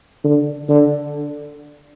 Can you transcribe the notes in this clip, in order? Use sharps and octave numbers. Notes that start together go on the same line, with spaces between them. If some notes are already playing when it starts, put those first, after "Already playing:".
D3
D3